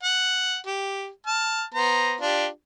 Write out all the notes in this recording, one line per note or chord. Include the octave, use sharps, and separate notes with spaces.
F#5
G4
A5 F6
B3 C5 A#5
D4 F4 G4